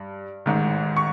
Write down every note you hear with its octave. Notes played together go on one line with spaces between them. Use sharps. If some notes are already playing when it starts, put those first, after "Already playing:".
Already playing: G2
A1 G#2 D#3
C#6